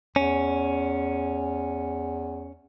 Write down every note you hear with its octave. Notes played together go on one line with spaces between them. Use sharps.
E2 C#4